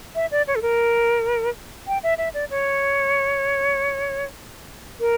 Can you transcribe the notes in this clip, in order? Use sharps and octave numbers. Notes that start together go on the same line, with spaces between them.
E5
D5
C#5
A4
A#4
G5
E5
E5
D5
C#5
A#4